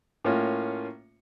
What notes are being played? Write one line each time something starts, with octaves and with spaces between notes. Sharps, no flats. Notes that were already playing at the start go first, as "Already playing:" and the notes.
A2 A#3 C#4 F4